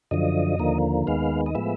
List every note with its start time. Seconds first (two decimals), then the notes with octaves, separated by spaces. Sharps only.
0.11 F#2 D3 F3 D#5
0.59 D#2 D3 F3 A#3
1.07 D#2 D#3 G#3 B3 F5
1.46 D#5
1.55 A2 F3 G#3 B3 E5